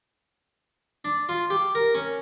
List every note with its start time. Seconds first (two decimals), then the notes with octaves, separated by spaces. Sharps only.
1.05 D4
1.29 F4
1.50 G4
1.75 A#4
1.95 C#4